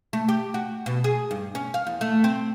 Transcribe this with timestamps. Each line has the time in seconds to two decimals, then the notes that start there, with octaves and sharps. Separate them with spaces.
0.13 A3
0.28 G4
0.54 F#4
0.86 B2
1.04 G#4
1.31 G2
1.55 C#4
1.74 F5
1.87 E2
2.01 A3
2.24 C4